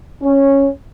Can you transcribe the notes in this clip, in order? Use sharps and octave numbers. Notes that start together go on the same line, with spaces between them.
C#4